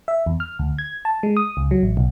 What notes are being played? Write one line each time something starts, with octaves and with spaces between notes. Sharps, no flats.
E5
E2
F6
D2
G#6
A5
G#3
D#6
C#2
F#3
A1
B1